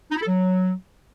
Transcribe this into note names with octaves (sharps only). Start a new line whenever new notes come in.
D#4
E4
A4
F#3